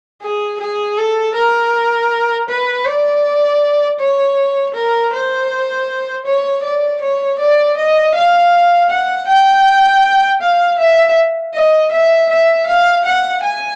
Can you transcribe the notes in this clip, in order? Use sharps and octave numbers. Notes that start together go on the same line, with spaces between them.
G#4
G#4
A4
A#4
B4
D5
C#5
A#4
C5
C#5
D5
C#5
D5
D#5
F5
F#5
G5
F5
E5
D#5
E5
E5
F5
F#5
G#5